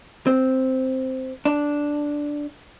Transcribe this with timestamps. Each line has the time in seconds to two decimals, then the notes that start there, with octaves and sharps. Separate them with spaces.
0.27 C4
1.45 D4